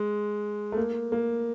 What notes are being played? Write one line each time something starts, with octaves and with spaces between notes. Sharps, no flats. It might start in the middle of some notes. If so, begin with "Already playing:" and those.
Already playing: G#3
A3
A#3
A#3